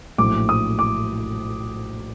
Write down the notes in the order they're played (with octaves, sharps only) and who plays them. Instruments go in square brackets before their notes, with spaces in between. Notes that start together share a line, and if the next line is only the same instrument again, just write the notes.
[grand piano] A#1 A2 F#3 D6
D#6
D6